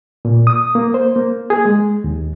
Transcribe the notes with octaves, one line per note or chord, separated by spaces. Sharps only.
A#2
D#6
A#3
C5
A#3
G#4
G#3
D#2